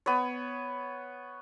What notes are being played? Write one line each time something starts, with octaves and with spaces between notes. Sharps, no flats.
B3 C#5